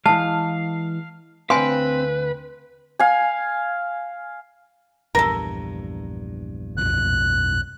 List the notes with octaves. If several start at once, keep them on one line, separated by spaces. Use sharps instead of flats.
E3 G#3 F5 A5
D2 C4 B4 F5 G5 G#5 C6
F5 G#5
A#1 E2 G2 A4 A#4
B1 F2 F3 F#6